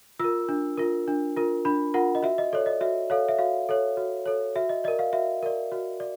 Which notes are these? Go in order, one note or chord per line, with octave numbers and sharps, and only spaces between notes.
F4 A#4 E6
D4
F4 A#4
D4
F4 A#4
D4 B5
F4 A#4 F#5
D#5
F#4 E5
D#5
A4 C#5 D5
D#5
F#4 E5
A4 C#5 F5
E5
F#4 F5
A4 C#5
F#4
A4 C#5
F#4 E5
D#5
A#4 D5 D#5
F5
F#4 E5
A#4 D5
F#4
D5